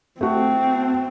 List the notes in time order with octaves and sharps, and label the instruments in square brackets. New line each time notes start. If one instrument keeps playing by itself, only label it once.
[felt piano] A3 F#4 [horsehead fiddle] C4